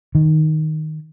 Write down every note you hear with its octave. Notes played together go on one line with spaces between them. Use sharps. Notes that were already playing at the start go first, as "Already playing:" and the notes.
D#3